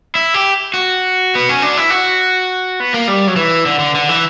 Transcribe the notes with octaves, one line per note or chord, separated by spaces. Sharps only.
E4
G4
F#4
B3
C#4
D4
E4
F#4
B3
A#3
G3
F#3
E3
D3
D3
D3
E3